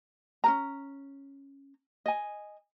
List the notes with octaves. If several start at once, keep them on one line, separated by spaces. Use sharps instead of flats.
C#4 A#4 A#5
D#5 G#5